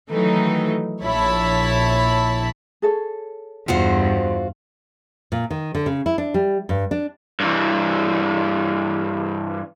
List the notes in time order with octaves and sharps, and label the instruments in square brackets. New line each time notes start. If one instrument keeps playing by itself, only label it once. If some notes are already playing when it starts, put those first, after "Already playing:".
[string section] D#3 E3 F#3 A3 D#4
A#1 E4 C#5 A5 B5
[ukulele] G#4 A4 C#5
[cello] E2 G2 [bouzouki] F4 F#4 C5
[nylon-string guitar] A#2
D#3
D3
C#3
E4
D4
G3
G2
D4
[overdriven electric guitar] G2 E3